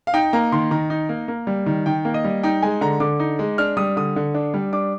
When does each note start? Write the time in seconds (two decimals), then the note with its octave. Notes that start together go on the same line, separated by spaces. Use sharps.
0.07 F5
0.14 D#4 G5
0.33 A#3 A#5
0.52 D#3 C6
0.71 D#3 A#5
0.90 D#4
1.09 A#3
1.28 A#3
1.47 G3
1.66 D#3
1.86 D#3 G5
2.05 A#3
2.14 D#5
2.25 G3
2.43 D#4 G5
2.62 G#3 G#5
2.81 D3 A#5
3.00 D3 D6
3.20 D#4
3.39 G#3
3.58 D4 F6
3.77 G3 D#6
3.97 D3 D#6
4.16 D3
4.34 D4
4.54 G3
4.73 D4 D6